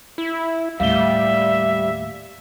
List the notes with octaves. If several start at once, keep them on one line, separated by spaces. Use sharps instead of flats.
E4
D#2 A2 G3 E5 F5 G7